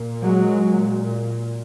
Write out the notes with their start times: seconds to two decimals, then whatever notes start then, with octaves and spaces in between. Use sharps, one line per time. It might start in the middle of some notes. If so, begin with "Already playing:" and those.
Already playing: A#2
0.22 F#3 G#3
0.65 A#2